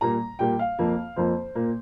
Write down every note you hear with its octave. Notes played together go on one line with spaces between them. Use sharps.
A#2 G3 A#3 A#5
A#2 G3 A#3 G5
F5
F2 F3 A#3
F2 F3 A#3 C5
A#2 A#3